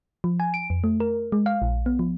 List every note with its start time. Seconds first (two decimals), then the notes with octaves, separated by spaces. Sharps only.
0.24 F3
0.40 G#5
0.54 D7
0.70 F2
0.84 A3
1.00 A#4
1.32 G#3
1.46 F5
1.62 A#1
1.86 B3
1.99 F3